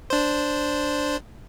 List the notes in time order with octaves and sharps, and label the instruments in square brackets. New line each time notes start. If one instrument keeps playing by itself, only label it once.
[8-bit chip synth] D4 C5